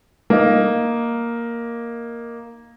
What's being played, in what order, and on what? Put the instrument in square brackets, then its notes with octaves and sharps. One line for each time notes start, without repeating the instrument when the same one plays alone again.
[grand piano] A#3 D#4